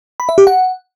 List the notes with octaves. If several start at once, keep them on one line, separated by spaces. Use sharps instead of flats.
B5
E5
G4
F#5